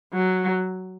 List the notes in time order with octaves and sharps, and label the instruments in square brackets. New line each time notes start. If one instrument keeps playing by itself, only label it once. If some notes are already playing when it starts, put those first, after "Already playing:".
[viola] F#3